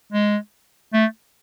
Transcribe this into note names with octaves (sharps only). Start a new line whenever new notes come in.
G#3
A3